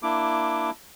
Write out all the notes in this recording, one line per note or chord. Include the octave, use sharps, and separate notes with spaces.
A#3 D4 E4 D6